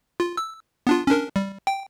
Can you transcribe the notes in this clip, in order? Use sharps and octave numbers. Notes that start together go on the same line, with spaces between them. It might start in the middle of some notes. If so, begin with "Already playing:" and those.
F4
E6
B3 D4 F4
C#4 D4 A#4
G3
G5